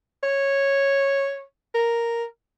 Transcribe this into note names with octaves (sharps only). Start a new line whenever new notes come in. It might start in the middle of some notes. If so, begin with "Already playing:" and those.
C#5
A#4